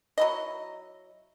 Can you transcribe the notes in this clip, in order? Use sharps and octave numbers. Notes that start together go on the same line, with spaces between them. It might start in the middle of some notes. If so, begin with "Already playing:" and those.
F#3 E4 D#5